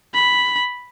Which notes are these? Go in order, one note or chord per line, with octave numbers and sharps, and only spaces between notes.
B5